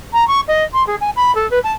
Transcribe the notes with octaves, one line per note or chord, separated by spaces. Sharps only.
A#5
C#6
D#5
C6
G#4
G#5
B5
A4
B4
A5